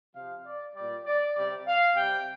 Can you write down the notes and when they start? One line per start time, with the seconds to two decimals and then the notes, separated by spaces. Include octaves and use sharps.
0.13 C3 F3 F5
0.44 D5
0.75 A#2 G3 D5
1.05 D5
1.35 C3 G3 D5
1.66 F5
1.96 C3 G3 G5